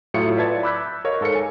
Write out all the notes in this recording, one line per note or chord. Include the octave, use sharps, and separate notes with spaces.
A2 F#3 F4 E5 C#7
B4 D5 E5 A5 G#6 A6
B5 D6 E6 F#6 G6 B6
A#4 C#5 D#5 F5
G#2 A4 A#4 C#7
G#5